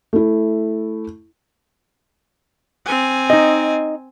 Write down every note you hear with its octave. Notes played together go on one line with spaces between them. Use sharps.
A3 E4
C4 G#5
D#4 D#5